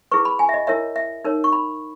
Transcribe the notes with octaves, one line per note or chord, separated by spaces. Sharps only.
E4 G#4 B4 C#6
B5
G#5
E5
D#5
E4 A#4 C#5 E5
E5
D#4 A#4 C#5
C#6
B5